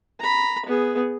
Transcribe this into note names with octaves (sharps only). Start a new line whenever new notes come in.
A#5 B5
B3 G#4